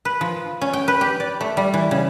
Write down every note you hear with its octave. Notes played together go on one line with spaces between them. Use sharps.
B4
F3
C#4
G5
B4
G4
D5
A3
G3
E3
C#3